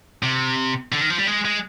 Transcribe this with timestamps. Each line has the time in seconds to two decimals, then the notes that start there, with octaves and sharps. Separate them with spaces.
0.23 C3
0.92 D3
1.01 D#3
1.10 F3
1.19 G3
1.27 G#3
1.45 G#3